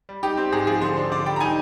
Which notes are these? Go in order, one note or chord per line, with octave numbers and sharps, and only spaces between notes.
G3
D#4 G4
C4
G#2 G#4
F3 G#4
D3 C5
D4
D3 D5
G3 G5
A#5
D#4 G#5